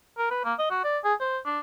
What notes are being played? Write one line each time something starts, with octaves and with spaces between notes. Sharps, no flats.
A#4
B4
A#3
D#5
F#4
D5
G#4
C5
D4